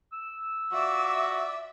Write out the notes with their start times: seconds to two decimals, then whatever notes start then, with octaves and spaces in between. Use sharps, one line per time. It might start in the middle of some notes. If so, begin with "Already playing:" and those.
0.13 E6
0.72 F4 F#4 D5 E5 D6